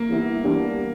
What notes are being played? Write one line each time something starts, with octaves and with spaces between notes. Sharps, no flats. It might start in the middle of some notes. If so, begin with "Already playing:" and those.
Already playing: A#3
E3 G3 B3 E4
E3 G3 B3 D4 G4